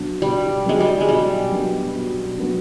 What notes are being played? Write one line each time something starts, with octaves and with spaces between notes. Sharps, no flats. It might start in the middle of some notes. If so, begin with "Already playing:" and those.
Already playing: B2 F#3 B3 D4
B2 G3
F#3 G#3 B3 D4
G3
G#3
B2 G3
F#3 B3 D4
B2
F#3 B3 D4